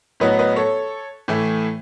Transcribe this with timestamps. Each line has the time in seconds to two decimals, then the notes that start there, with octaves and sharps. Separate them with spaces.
0.20 A2 F#3 B3 B4 D#5
0.39 B4 D#5
0.56 A4 C#5
1.28 A2 E3 A3